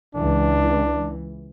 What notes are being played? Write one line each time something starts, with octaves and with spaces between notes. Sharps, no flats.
C#2 E3 D4